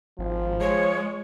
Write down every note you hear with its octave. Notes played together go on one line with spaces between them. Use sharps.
G#1 F3
G#3 C#5